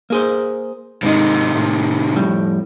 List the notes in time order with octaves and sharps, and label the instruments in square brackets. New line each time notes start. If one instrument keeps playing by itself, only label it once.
[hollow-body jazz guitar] A#3 G#4 C5
[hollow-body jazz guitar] G#2 D#4 [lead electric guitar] C3 D#3
[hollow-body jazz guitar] A2
F2 A2 G3